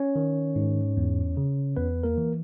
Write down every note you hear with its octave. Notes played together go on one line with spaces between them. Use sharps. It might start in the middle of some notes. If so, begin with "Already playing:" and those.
Already playing: C#4 C#5
D#3
G#2
E2
C#3
E2 B3 B4
A#3 A#4
E3